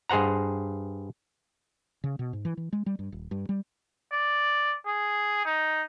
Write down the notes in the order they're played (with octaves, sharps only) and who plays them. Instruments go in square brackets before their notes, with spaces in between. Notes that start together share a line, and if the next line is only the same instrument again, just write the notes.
[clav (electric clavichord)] G2 G#4 C5 F#5 A#5
[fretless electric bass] C#3
B2
G#2
E3
E3
G#3
G3
G2
D#1
G2
G3
[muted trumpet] D5
G#4
D#4